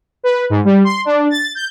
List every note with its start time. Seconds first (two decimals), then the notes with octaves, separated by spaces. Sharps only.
0.24 B4
0.50 G#2
0.65 G3
0.84 C6
1.05 D4
1.30 A6
1.55 G6